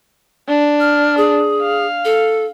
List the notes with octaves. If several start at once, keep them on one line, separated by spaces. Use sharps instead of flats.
D4
F6
G#4
F5
A4